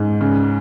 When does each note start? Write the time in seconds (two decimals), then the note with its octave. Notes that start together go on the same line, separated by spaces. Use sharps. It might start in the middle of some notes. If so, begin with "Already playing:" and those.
Already playing: G#2
0.21 C#3